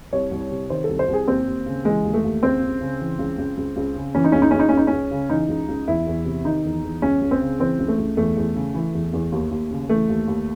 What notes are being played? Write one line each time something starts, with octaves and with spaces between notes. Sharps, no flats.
C2 C#5
C2
C3
D#3 C5
C2 A4
C5
C2
G#4
D#2 C4
D#2
C#3
E3 G#3
D#2
A3
D#2
C#2 C4
C#2
C#3
E3
C#2
C#2
C#2
C#2
C#3
E3 C#4
D#4
C#2 C#4
D#4
C#2 C#4
D#4
C#2 C#4
D#4
C#2 C#4
C#3
E3 D#4
C#2
C#2
E2 E4
E2
C3
D#3 D#4
E2
E2
C#2 C#4
C#2
C4
C#3
E3 C4
C#2
A3
C#2
E2 A3
E2
C#3
E3
E2
E2
D#2
D#2
C#3
E3 A3
D#2
D#2